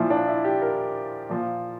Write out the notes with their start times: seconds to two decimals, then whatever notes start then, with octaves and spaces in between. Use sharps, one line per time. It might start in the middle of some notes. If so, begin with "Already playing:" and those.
Already playing: A#2 F3 E4
0.10 D4
0.28 E4
0.45 G4
0.62 A#4
1.29 A#2 F3